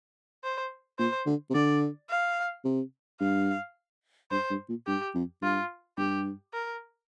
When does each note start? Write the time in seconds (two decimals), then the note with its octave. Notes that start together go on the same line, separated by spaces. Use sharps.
0.44 C5
0.99 A#2 C5
1.26 D3
1.50 C3
1.54 D3 D5
2.09 F5
2.65 C3
3.21 G2 F5
4.31 G2 C5
4.50 G2
4.69 A#2
4.87 G2 G4
5.15 F2
5.42 G2 F4
5.98 G2 G4
6.53 A#4